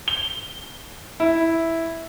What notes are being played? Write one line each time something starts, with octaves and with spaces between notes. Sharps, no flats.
G7
E4